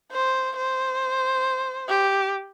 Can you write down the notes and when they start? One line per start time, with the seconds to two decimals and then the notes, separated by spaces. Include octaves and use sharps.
0.12 C5
0.56 C5
1.89 G4